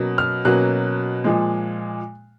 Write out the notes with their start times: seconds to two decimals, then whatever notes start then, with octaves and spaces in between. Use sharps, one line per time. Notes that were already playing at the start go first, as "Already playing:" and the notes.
Already playing: B2 F#3 A#3 C#4
0.18 F6
0.45 B2 F#3 A#3 C#4 F#6
1.24 A#2 F3 G#3